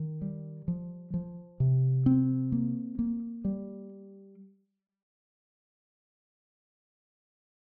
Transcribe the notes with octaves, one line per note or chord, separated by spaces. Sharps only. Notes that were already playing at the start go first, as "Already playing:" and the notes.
Already playing: D#3
G3
F3
F3
C3
C4
A#3
A#3
G3